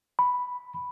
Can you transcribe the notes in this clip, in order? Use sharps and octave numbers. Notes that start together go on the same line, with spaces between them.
B5